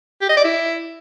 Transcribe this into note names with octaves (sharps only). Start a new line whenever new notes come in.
G4
D#5
D5
E4